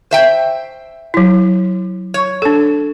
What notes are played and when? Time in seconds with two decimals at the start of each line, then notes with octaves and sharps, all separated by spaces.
0.11 C5 E5 G5
1.14 F#3 E4
2.14 C#5
2.42 D4 A4